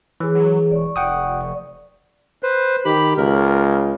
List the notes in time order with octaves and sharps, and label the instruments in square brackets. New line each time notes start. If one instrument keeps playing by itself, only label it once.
[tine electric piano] E3 [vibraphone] G#4 C#5
[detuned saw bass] F#3
[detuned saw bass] E1 [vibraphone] D5 C#6
[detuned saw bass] F1 [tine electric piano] F#5 G5 D#6
[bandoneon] B4 C5
[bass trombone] D#3 [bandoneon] G4 B5
[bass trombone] C#2 [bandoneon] A#4